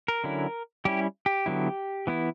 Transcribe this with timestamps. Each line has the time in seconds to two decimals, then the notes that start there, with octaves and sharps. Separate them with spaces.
0.08 A#4
0.24 D3 F#3 C#4 E4
0.85 G3 C#4 E4 G4
1.26 G4
1.46 D3 F#3 B3 E4
2.07 E3 B3 E4